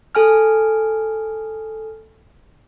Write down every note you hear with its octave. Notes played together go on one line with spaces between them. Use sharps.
A4 G#5 F6